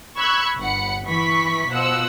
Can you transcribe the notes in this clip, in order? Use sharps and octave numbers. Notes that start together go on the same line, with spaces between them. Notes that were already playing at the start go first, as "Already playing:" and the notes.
B5 C#6 E6 F#6 G#6
G1 F#5 B5 C#7
E3 B5 C#6 B6
B2 F3 F#5 E6